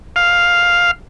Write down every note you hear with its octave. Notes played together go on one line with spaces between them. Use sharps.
F5